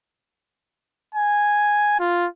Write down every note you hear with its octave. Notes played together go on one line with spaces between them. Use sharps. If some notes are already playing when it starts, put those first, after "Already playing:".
G#5
F4